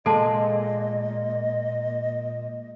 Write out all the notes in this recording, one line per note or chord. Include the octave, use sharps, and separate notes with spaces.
A#2 G#3 A4 D#5 A5